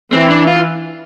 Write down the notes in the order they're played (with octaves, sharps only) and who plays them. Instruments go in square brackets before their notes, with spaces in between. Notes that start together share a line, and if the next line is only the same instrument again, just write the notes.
[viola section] E3 [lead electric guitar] C4
[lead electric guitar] D4
F4